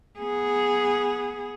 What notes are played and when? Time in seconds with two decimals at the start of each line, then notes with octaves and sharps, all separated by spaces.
0.19 B3 G#4